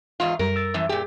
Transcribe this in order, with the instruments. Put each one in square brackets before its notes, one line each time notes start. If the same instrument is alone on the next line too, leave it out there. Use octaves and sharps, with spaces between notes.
[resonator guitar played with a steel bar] E2 G#2 F4
[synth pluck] F#2 G3 [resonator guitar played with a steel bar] A#4
[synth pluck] E6 A6
[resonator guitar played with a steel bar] F#2 A2 E3
[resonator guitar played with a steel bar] A#2 G4 [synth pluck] G#4